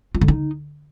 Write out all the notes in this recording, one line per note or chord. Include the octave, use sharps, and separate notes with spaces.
F4
D3
D#4